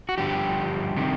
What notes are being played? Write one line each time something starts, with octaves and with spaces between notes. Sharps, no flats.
F#4
G2 D3 F3 G4
C3 D#3 G3 C4